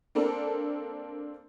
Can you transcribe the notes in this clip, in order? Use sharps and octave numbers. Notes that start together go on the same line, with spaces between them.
A#3 C4 D4 A4 A#4